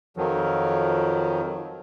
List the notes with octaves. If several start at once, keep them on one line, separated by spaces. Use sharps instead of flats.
F2 D#3 F3 F#3